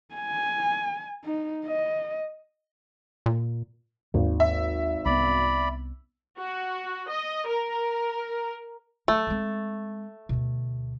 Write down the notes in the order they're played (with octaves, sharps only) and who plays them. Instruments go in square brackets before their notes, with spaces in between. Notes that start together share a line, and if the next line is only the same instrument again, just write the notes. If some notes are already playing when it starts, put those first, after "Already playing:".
[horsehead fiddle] G#5
D#4
D#5
[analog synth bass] A#2
[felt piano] G#1 [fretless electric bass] D#2
[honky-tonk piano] E5
[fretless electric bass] C2 B3 [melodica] D5 B5
[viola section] F#4
D#5
A#4
[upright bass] F#3 [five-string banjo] A3
[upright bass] G#3 C4
D2 B2